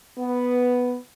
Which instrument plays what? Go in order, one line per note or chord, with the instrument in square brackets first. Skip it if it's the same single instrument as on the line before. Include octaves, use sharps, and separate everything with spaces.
[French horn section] B3